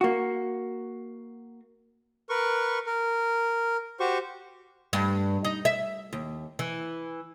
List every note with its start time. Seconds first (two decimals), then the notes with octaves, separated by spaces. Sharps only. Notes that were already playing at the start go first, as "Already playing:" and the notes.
0.01 A#3 F#4
2.29 A#4 B4 C#6
2.86 A#4
4.00 F#4 G4 C5 C#6
4.93 G2
5.45 D#4
5.65 E5
6.13 D#2
6.59 E3